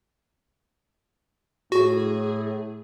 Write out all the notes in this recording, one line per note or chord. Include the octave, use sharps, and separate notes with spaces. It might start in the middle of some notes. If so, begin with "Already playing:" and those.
A2 F#4 G#4